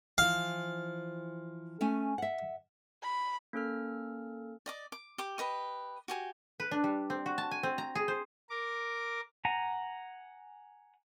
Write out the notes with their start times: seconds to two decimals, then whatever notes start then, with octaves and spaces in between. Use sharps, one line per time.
0.18 E3 F3 F5
1.81 A3 C#4 G#5
2.18 E5 F#5
3.03 B5
3.53 A#3 C#4 A4 F6
4.66 D5 D#5 D6
4.92 D6
5.18 G4 D6
5.38 G4 B4 D#5 C#6
6.08 F#4 G4 G#5
6.60 B4
6.71 D4
6.84 G3
7.10 C4
7.26 F#4
7.38 A5
7.51 G#5
7.63 C4
7.78 A#5
7.95 G#4
8.08 C5
8.50 A#4 D6
9.45 F#5 G#5 A#5